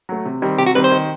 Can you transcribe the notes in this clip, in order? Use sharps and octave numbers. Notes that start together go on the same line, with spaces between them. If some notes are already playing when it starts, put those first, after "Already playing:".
F#3 A3
C3
D#3 G3 C4
C3 G4
F#4
D#3 G3 C4 B4
C5
D#3